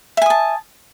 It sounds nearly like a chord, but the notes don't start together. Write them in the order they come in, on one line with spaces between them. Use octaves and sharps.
E5 G#5 D#6 A5